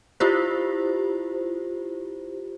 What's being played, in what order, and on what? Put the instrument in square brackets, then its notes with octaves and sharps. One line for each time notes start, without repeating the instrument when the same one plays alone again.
[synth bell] E4 F4 G4 C5